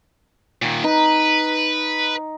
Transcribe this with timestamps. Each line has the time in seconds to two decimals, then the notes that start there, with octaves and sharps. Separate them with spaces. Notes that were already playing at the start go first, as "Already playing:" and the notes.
0.62 A#2 D#3
0.84 D#4 B4